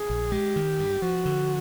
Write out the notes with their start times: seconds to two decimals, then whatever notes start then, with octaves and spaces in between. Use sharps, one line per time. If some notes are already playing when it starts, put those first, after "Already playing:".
Already playing: G#4
0.10 A#1
0.32 G#3 G4
0.56 D#3
0.80 G2
1.02 F3 F#4
1.26 D3